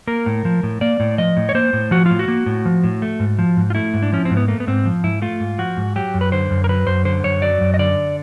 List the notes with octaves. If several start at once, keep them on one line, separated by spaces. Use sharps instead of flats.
A#3 A#4
A2
F3
A2
A#3 D5
A2
F3 D#5
A2
C#5
A#3 C5
A2
F3 F#4
A2 F4
F#4
A#3
A2
F3
A2
A3
G#2
F3
G#2
F4
A3 E4
G#2
D4
F3 C#4
C4
G#2
B3
A3 A#3
B3
G#2 C4
F3
G#2 E4
A3 F4
G#2
F3 F#4
G#2
F#3 G4
F#2
B4
D3 C5
F#2
A#4
F#3 B4
F#2 C5
D3 C5
F#2 C#5
F#3 D5
F#2
D#5
D3 D5